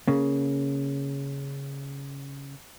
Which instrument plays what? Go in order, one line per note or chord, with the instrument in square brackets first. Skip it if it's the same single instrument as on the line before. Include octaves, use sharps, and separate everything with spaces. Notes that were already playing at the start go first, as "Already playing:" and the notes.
[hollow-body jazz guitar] C#3 A#3